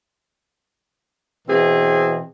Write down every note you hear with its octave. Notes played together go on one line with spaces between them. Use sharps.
B2 E3 C4 G#4